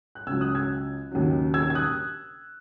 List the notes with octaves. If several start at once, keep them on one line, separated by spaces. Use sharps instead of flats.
F#6
C#2 C#3 F#3 E6 G#6
D#6 F#6
E6 G#6
D#2 C#3 F#3
E6 G#6
G#6
D#6 F#6